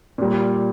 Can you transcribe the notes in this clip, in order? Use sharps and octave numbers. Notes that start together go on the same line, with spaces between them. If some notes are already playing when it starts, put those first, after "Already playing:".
A#2 G3